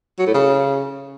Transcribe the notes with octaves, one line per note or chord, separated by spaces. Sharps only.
F#3
A2
C#3